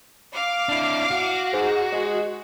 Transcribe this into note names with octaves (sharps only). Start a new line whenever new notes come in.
F5 D6
D4 E4
F#4
G#2
G#3